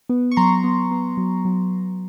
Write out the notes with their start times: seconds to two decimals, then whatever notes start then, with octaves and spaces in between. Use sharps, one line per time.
0.09 B3
0.31 C#6
0.36 F#3 A#5 C6
0.64 B3
0.91 B3
1.17 F#3
1.45 F#3